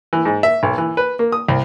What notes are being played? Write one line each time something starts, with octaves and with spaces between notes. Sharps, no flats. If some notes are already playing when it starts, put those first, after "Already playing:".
E3
G#2
E5
B1
E3
B4
A#3
D#6
C2